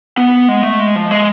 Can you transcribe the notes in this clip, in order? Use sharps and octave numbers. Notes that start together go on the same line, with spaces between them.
B3
G#3
A3
G#3
F3
G#3